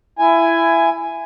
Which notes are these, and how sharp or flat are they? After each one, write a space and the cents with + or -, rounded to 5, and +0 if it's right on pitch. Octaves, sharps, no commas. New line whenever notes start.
E4 +20 G#5 +0